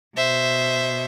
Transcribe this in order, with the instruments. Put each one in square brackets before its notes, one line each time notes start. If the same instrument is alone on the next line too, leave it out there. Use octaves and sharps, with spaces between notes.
[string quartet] B2 C5 E5